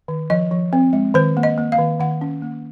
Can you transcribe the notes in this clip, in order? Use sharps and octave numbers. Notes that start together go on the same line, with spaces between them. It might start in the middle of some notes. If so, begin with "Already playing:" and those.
D#3
F3 D#5
F3
C4
G#3
D#3 C5
A#3
D#5
A#3
F5
D#3
D#3 F#5
C#4
A#3